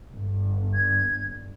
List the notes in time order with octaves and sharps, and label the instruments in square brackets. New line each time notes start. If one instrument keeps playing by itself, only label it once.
[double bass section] G1
[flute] G#6